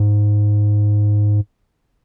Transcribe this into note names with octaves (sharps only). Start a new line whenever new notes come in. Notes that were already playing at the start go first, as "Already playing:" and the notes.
Already playing: G#2